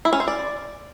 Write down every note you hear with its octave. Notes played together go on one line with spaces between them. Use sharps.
E4
C#4
C5
D5